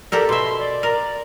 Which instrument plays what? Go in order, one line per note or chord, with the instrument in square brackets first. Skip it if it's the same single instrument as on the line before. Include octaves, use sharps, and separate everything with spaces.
[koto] G4 A4 A#4 [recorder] D5
[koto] B2 E5 [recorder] C6
[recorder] D5
[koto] A#4